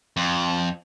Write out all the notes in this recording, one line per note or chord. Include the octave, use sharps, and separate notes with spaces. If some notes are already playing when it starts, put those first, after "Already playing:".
F2